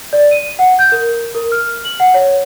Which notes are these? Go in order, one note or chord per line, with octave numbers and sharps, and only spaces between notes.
D5
D#7
F#5
G6
A#4
A#4
F6
F#7
F#5
C#5